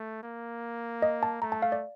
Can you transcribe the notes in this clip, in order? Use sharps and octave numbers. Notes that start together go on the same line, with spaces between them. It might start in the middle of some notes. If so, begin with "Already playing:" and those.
Already playing: A3
A#3
D#5
A5
A3 A#5
A5
F5
D5